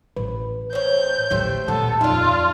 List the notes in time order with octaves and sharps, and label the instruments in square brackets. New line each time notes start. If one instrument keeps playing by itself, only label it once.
[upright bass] A1 [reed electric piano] B4
[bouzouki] C4 C#5 [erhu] G6
[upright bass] A1 D2 [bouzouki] A3 G4 C5
[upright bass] D#1 [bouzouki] B3 [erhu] A4
[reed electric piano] F2 D#4 [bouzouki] D4 E5 [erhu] F4